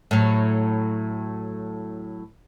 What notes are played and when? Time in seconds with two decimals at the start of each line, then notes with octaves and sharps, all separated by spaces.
0.11 A2 F#3